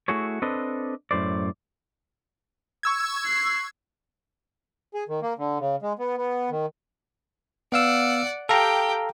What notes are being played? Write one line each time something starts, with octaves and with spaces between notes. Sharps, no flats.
A3 E4 F#4 G#4 C#5
C4 D4 A4 B4 D#5
F#2 A2 C5 D5
C#6 E6 G#6
F#6 C7
G#4
D#3
A#3
D3
C#3
G#3
B3
B3
D#3
B3 D5 F5 F#5 E6
G4 A4 F5 G5 A#5